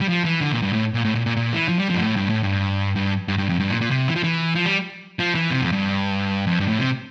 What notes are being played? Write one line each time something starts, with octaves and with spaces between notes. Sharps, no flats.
G3
F3
E3
D3
A#2
G2
A2
A#2
A2
A#2
A#2
A#2
E3
F3
G3
F3
G2
A2
G2
A2
G2
G2
G2
G2
F2
G2
A#2
A#2
C3
E3
F3
E3
F3
G3
F3
E3
C3
F2
G2
F2
G2
A2
C3